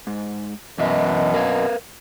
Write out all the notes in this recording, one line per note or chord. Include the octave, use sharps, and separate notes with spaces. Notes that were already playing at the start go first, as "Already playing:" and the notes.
G#2
F#2 B2 E3 D#5 E5
A#4 B4 F5